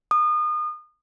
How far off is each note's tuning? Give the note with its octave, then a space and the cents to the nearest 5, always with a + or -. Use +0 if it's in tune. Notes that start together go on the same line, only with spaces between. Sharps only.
D#6 -35